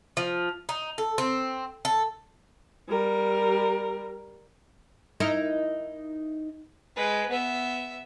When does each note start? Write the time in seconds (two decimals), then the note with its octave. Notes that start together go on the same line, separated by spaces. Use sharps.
0.17 F3
0.69 D#4
0.98 A4
1.18 C4
1.85 A4
2.88 G3 A#4
5.20 D#4 E4 A#4
6.96 G#3 B4
7.29 B3 E5